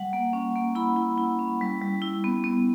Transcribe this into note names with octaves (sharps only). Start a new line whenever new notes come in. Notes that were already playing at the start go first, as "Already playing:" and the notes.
Already playing: G3 F#5
A#3
C#4
A#3
E4 B5
E4
E4
C#4
G3
G3
E4
B3
B3